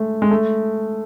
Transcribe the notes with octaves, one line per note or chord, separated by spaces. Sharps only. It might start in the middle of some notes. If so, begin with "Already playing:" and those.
Already playing: G#3 A3
G#3
A3